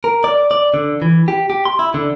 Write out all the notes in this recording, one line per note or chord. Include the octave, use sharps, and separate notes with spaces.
A#4
D5
D5
D3
E3
G4
G4
C6
E4
D3